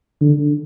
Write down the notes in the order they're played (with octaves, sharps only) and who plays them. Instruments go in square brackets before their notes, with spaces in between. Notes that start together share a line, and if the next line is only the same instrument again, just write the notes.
[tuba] D3